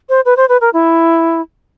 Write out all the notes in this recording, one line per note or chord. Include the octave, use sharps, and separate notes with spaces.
C5
B4
C5
B4
A#4
E4